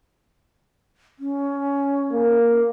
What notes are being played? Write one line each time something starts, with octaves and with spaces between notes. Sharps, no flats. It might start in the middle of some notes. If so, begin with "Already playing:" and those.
C#4
A#3